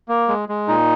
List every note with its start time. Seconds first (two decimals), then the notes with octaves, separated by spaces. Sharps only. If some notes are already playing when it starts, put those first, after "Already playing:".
0.09 A#3
0.28 G#3
0.49 G#3
0.68 A#2 D#4